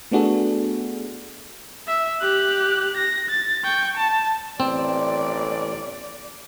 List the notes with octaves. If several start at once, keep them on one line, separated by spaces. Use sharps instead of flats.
A3 B3 D4 F#4 G#4 A4
E5
G4 F#6
A#6
A6
G5 C#6
A5
A1 C4 D5